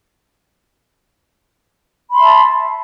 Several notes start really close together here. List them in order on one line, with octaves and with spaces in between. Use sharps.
B5 C6 E5 A5